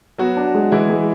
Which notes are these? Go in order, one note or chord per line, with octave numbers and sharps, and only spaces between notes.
F#3 B3 F#4
D4
G#3
E3 G#3 E4
G#3